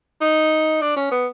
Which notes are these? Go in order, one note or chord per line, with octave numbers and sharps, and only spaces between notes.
D#4
D4
C#4
B3